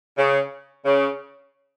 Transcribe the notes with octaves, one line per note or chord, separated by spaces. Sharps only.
C#3
C#3